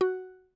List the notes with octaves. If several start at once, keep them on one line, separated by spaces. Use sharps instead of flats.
F#4